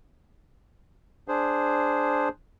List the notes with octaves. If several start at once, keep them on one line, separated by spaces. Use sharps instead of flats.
D4 G#4 C5